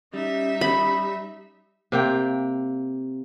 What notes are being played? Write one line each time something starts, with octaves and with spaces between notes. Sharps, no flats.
G3 C#4 D#4 E5
B5
C3 A#3 G5